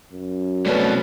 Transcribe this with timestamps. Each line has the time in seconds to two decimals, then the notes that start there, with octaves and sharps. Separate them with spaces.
0.13 F#2
0.66 C2 B2 A3 C#4 B4 D5